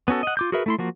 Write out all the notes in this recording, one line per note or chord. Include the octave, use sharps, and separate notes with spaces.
B3 C#4 F#4 A4
D#5 F#5
F4 D6 G6
F#4 G#4 A#4 B4 E5
A3 E4 C6
F3 A#3 F#4